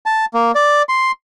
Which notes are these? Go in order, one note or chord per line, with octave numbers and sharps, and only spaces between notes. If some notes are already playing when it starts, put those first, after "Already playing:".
A5
A#3
D5
C6